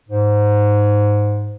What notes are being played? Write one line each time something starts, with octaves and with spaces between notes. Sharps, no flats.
G#2